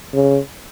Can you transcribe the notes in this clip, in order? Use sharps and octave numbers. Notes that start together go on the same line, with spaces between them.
C#3